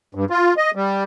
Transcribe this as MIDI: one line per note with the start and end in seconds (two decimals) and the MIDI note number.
0.15 0.25 43
0.30 0.54 65
0.57 0.71 75
0.75 1.04 55